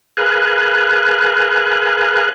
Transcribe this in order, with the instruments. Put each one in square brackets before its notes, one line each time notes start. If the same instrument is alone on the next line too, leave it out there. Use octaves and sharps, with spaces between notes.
[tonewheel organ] G#4 A#4 B4 F5 G#5 F#6